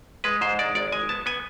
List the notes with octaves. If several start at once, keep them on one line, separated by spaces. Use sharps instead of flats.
G#3 B4
G#2 C5
G#3 D5
G#1 D5
G#3 G#5
B3 A5
B3 G#5